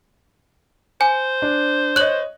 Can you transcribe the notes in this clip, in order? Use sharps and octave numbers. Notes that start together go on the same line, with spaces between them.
C5 G#5
D4
C#5 D#5 F#6 F#7